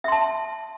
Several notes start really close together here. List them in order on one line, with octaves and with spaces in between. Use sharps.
E5 C6 A5